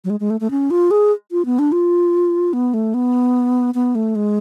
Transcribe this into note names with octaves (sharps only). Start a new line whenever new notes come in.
F#3
G#3
G#3
A3
A3
C#4
F4
G#4
F4
B3
D4
F4
B3
A3
B3
B3
A3
G#3